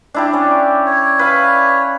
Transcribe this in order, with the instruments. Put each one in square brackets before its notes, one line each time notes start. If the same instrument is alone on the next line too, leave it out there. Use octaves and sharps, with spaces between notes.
[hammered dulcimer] D4 E4 G4
C#4 D5
[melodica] C#5
[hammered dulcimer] B4 F5